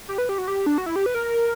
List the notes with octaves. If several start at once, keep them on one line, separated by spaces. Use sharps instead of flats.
G4
B4
G4
F#4
G4
D4
F#4
E4
G4
B4
A#4